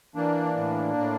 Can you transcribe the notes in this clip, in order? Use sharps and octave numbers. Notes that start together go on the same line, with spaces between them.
E3 A#3 D4
A2
A2